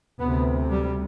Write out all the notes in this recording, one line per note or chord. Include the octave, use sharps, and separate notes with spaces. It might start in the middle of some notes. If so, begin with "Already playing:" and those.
D2 C3 B3
G3